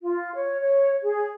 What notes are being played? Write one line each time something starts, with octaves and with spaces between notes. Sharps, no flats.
F4
C#5
C#5
G#4